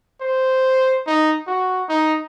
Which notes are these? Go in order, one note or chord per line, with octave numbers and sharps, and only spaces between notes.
C5
D#4
F#4
D#4